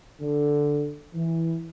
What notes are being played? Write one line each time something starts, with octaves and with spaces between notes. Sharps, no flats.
D3
E3